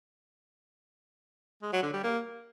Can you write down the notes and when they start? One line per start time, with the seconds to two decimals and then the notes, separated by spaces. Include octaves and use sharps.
1.62 G#3
1.72 F#3
1.83 D3
1.93 G3
2.03 A#3